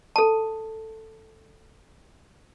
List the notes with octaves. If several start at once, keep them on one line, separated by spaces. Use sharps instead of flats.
A4 A5